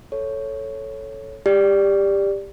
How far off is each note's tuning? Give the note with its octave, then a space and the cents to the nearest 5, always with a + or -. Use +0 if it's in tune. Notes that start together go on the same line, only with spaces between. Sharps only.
A4 +0 C#5 +0
G4 +20 D5 +0